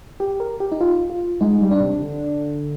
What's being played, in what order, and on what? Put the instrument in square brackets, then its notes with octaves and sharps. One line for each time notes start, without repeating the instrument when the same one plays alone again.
[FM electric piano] G4
A#4
G4
D#4
F4
F4
[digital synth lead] G#3 [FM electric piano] D#4
[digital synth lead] G3
[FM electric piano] D4
[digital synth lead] C3
D3